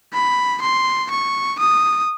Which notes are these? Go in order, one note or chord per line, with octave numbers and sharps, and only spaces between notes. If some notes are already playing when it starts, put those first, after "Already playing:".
B5
C6
C#6
D#6